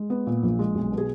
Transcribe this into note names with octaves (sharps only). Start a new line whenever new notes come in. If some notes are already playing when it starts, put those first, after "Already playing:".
Already playing: G#3
B3
A#2
A#1
G#3
B1
B2
G#4